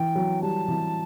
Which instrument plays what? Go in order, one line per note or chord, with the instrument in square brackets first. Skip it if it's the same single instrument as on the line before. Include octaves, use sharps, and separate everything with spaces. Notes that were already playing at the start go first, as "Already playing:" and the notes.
Already playing: [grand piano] E3 [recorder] G5
[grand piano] F#3
[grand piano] G3 [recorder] A5
[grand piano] E3